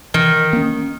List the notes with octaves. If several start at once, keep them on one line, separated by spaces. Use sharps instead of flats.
D#3 E3
A#3 C#4